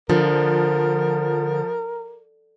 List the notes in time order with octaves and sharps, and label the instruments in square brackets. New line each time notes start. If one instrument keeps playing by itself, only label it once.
[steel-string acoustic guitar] D3 [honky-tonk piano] F3 [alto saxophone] A#4